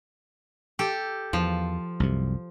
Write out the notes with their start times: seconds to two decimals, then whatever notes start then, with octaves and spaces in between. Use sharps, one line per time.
0.79 G4 A4
1.33 E2 F3
2.00 C2 F#2 C3